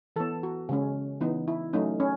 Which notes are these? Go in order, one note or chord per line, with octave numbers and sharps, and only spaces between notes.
E3 B3 A4
F#4
C#3 G#3 C#4
E3 B3 D#4
E4
F#3 A3 C#4 D#4
C#4